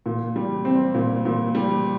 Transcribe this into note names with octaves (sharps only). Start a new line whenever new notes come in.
A#2
G3
C4
A#2
A#2
G3